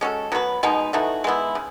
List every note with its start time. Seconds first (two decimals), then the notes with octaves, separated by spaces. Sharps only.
0.01 G#3 C#4 F#4 A4
0.32 F#3 B3 F#4 B4
0.63 B2 G#3 B3 D#4
0.93 E3 A3 D#4 F#4
1.24 G#3 B3 E4
1.55 C#3